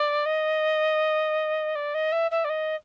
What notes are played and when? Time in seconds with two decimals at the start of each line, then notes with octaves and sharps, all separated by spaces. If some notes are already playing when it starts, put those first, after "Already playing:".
Already playing: D5
0.26 D#5
1.75 D5
1.94 D#5
2.12 E5
2.31 E5
2.45 D5
2.50 D#5